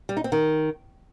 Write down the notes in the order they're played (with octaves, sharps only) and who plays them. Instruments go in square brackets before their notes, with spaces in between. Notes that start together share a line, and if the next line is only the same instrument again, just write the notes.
[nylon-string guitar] G3
D#4
C4
D#3